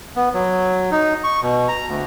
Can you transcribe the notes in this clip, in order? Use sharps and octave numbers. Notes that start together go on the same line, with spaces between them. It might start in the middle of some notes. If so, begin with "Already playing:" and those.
B3
F#3
D#4
C#6
B2
A#5
D2